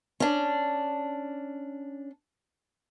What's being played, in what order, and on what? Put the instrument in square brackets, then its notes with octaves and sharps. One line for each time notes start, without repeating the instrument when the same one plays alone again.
[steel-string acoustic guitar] C#4 D4